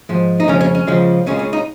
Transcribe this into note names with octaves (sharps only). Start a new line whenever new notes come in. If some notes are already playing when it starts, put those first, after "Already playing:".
G#2 F3 G#3
D#4
F2 C#3 G#3 C#4
C#4
C#4
C#2 C#3 F3 G#3
C#2 C#3 G#3 C#4
C#4
D#4